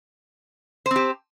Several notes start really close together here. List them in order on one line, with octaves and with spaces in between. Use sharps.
C5 C4 G4